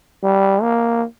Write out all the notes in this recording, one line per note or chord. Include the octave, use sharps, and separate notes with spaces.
G3
A#3